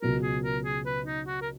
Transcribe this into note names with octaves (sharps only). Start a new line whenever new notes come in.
C#2 B2 F#3 A#4
G#4
A#4
G#4
B4
D#4
F#4
A#4